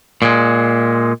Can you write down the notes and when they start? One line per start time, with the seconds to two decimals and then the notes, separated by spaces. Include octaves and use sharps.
0.22 A#2 G#3